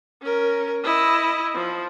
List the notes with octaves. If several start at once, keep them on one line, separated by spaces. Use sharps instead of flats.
C#4 A#4
E4 D#5
F3